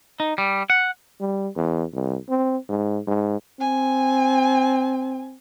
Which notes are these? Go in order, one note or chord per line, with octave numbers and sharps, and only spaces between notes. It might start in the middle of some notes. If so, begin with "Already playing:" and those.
D#4
G3
F#5
G3
E2
C2
C4
G#2
G#2
C4 G#5